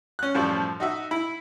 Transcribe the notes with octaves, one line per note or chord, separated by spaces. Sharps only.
C#4 F#6
F#2 A2 F3 G3
D#4 F#4 E5
E4 B5